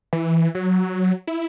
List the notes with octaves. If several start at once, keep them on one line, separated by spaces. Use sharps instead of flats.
E3
F#3
E4